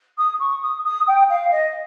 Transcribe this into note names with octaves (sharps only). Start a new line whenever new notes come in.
D#6
C#6
D#6
D#6
G5
F5
D#5